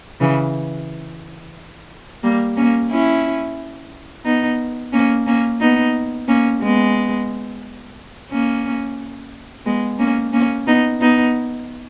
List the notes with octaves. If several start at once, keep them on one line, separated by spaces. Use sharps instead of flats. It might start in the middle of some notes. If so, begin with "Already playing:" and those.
C#3 E3
G3 A#3
A#3 C#4
C#4 E4
B3 D#4
A#3 C#4
A#3 C#4
B3 D#4
A#3 C#4
G#3 B3
A#3 C#4
G#3 B3
A#3 C#4
A#3 C#4
B3 D#4
B3 D#4